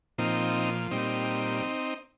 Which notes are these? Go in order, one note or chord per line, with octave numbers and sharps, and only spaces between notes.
A#2 F3 C4 D#4
A#2 G3 C4 D#4